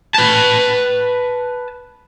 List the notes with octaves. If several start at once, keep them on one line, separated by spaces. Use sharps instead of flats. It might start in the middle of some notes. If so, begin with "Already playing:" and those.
B4 A5